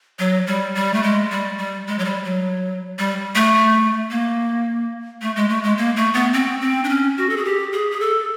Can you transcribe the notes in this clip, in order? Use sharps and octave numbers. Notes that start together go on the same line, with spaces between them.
F#3
G3
G3
A3
G#3
G3
G3
G#3
F#3
G3
F#3
G3
A3
A#3
A3
G#3
A3
G#3
A#3
A3
B3
C4
C4
D4
C#4
F#4
A4
G#4
G4
G#4
G#4
A4